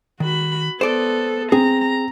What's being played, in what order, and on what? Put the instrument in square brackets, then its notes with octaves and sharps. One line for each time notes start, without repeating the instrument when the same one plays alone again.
[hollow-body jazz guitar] D#3 [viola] F#4 B5
[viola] B3 A4 [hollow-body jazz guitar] C5 D5
[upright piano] C4 [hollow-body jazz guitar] G#4 [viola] A#5